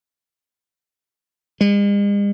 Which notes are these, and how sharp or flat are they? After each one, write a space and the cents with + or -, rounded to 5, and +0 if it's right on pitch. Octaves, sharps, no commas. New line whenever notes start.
G#3 -45